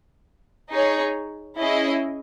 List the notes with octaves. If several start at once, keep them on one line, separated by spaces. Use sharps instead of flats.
D#4 G#4 C#5
C#4 E4 G#4 D#5